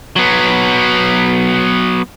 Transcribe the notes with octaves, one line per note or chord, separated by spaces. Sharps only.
F#3 B3